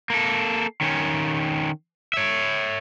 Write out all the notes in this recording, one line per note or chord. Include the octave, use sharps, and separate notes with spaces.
A#3 A4
D#3 C#4
C#5 E5